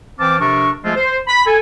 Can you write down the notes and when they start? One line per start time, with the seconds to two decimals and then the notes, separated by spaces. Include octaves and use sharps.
0.19 E3 C4 C5 F5 A5 D6
0.40 C3 F3 D4 A4 A#4 C#6
0.84 F3 G#3 A3 C4 F4 G#4
0.96 C5
1.28 B5
1.46 A4 G#5